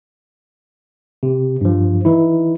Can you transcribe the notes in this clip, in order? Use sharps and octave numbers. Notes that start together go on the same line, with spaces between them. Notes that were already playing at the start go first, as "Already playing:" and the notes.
C3
G2 F3
E3 D#4 E4